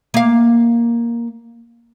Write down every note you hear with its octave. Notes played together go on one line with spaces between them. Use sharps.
A#3 F5